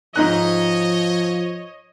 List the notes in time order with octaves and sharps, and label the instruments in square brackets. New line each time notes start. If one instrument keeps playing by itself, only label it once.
[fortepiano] G#2 D#4 F#6 [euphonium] F3 [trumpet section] C#5 D#5